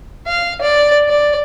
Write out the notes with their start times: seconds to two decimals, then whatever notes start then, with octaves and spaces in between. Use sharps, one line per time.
0.27 F5
0.62 D5
1.09 D5